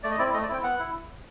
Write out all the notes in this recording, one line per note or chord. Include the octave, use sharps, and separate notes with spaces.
A3 D5
D#5
C4 E4 D5
A3 D#5
D5
C4 E4 G5
B3 F#5
E4